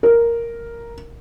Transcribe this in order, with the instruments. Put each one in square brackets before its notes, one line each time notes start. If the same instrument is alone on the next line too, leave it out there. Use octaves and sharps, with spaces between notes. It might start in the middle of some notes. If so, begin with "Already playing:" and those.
[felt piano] A#4